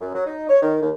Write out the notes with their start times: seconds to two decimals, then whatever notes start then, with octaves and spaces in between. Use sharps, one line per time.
0.01 F#2
0.14 F#3
0.26 D#4
0.49 C#5
0.62 D#3
0.82 D#2